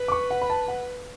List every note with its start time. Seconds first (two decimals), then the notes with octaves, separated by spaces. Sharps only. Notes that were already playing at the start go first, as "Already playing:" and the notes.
Already playing: B4
0.08 D6
0.12 C#6
0.31 F#5
0.42 B5
0.50 A5
0.68 F#5